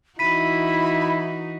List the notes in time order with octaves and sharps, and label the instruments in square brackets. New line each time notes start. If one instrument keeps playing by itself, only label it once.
[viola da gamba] E3 D#4 F#4 [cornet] E4 [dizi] B5 [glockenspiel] B6 D#7